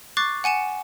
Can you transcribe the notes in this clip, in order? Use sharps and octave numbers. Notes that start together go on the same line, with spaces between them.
C#6 D6 F#6 A6 C7
F#5 G#5 C#7 E7